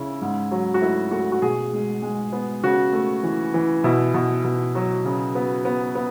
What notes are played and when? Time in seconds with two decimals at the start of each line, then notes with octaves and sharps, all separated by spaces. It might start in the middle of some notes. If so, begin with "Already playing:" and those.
Already playing: C#3 E4
0.21 G#2
0.51 F#3
0.74 F#4
0.81 A3 E4
1.11 A3 F#4
1.32 F#4
1.42 B2 G#4
1.73 G#3
2.02 G#3
2.32 B3
2.63 C#3 F#4
2.93 A3
3.23 E3
3.54 E3
3.84 B2 E4
4.14 B2
4.44 B2
4.75 F#3
5.05 C#3
5.35 B3
5.65 B3
5.95 B3